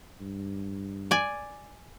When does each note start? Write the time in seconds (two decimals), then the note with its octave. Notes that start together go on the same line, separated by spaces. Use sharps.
0.21 G2
1.11 D5 G#5